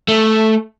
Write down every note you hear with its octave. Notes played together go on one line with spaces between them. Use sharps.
A3